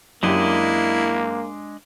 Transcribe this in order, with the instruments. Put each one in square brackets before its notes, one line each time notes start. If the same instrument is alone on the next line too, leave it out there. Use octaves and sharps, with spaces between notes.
[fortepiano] F#2 G4 [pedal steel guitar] G#3 D4 D#5 [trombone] A#3 [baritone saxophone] E4